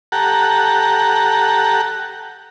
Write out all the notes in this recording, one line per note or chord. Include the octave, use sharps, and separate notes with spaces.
G4 A4 F#5 A#5